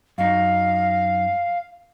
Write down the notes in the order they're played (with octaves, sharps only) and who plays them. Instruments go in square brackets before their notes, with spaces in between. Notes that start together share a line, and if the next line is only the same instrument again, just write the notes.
[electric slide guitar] F#2 D#4 [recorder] F5